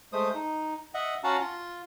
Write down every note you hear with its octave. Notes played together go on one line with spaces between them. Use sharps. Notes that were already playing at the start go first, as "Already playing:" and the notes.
G#3 A3 C5 D#6
D#4
D#5 E5 F#5
C#4 F#4 F5 F#5 A5 A#5
F4